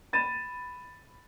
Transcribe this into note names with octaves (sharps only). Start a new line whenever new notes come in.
B5 A6 D#7 E7